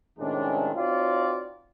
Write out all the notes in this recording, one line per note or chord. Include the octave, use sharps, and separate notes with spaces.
A2 C3 D#3 G#3 C#4 D4
C4 D#4 F4 F#4 C#5 D5